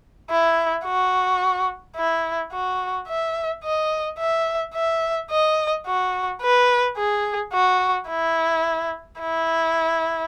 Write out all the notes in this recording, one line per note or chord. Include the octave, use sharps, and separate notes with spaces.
E4
F#4
E4
F#4
E5
D#5
E5
E5
D#5
F#4
B4
G#4
F#4
E4
E4